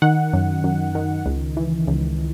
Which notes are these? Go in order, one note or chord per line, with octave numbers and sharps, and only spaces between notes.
D#3 F#5
F#2
F#2
D#3
C#2
E3
C#2